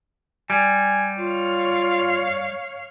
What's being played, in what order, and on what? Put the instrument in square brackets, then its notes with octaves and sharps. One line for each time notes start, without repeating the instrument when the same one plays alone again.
[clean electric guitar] G3 [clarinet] G#5
[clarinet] F4 [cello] C#5 F5